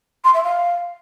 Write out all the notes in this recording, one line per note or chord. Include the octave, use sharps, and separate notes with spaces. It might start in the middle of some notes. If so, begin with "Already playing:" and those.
C6
E5
F5